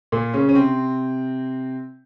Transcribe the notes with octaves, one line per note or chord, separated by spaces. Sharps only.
A#2 A#3
C#3 C#4
C#4
C3 C4